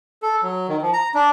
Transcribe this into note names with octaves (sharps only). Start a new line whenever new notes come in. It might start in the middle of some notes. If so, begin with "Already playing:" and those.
A4
F#3
D#3
F3
A#5
D4